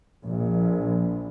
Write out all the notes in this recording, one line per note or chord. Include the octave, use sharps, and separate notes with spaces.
A#1